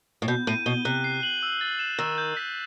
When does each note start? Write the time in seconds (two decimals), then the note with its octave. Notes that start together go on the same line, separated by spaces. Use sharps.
0.22 A2
0.28 B2 G6
0.47 A2 D#7
0.66 B2 G7
0.85 C3 F#6
1.04 C7
1.23 F#7
1.43 E6
1.61 A6
1.79 E7
1.98 D#3 E6
2.18 G6
2.37 B6